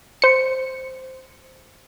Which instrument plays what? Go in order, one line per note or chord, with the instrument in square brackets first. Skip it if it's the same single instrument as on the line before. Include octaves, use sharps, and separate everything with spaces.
[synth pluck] C5 C#7